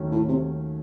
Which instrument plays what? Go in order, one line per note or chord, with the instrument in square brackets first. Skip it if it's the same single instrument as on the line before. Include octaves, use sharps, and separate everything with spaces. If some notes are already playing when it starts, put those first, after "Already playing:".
Already playing: [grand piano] D#2 D#3 F#3 A3 C#4
[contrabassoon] A2
C3